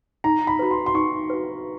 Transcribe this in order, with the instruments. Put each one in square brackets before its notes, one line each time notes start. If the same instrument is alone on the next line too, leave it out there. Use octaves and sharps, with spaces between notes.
[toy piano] D#4 [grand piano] A#5
[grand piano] B5
[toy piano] F#4 B4
[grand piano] C6
C6
[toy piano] D#4 [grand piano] C#6
[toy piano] F#4 B4